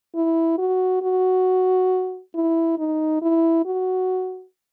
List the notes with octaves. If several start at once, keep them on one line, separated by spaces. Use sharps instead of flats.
E4
F#4
F#4
E4
D#4
E4
F#4